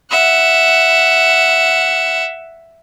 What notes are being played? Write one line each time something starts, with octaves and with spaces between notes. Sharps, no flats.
E5 F#5